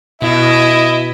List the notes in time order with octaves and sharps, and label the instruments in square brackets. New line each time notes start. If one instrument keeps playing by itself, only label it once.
[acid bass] B2 [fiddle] E4 [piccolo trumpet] D#5